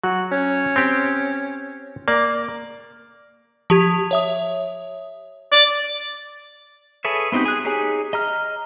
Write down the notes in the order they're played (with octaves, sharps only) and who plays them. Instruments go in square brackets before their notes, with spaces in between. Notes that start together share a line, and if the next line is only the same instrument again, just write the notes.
[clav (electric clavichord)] F#3 [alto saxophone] F#4
[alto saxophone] C#4
[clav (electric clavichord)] C4 G4
[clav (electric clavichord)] A#3 [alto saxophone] D5
[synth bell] F3 G4 G#6
C#5 E5 D#6
[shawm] D5
[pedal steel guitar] G#4 A4 B4 C#5 E5
B3 C4 D#4 F#4 G4
G#4 F#6
D#4 G4 G#4 C#5 G#5
D#5 A#5 F6